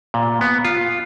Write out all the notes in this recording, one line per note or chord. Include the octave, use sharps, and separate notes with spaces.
A#2
B3
F4